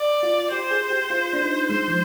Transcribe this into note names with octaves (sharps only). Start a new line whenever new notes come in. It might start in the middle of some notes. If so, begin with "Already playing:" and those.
Already playing: D5
F4
G4 C5
G#4
G4
F4
D4
D#4
G#3 C5
F3